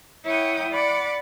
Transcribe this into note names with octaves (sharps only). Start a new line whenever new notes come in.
E4 C#5 F#5 G5 D#6
D5 F#5 B5 D6